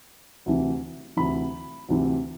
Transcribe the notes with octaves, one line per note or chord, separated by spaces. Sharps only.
D2 C3 E3
D2 C3 E3 B5
D2 C3 E3